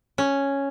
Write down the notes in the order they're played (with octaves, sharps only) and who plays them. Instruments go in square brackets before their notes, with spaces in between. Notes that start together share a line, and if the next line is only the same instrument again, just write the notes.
[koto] C#4